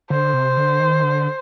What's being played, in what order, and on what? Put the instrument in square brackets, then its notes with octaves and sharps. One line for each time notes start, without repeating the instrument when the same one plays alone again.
[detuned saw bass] D3 [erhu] C5
[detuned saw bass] C3
D3
D#3
D3